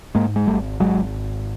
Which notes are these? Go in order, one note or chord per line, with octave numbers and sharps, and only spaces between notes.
G#2 G#3 A#3
G#3
G#1 G3 A3
G#1 F#3 G#3